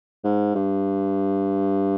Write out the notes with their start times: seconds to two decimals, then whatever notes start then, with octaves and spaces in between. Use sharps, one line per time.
0.24 G#2
0.55 G2